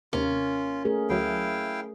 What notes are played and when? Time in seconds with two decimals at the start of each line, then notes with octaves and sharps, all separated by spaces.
0.13 D#2 C3 A#3 C#4 F4 A#4
0.85 A3 G#4 A#4
1.09 D2 F#3 E4 F5 G5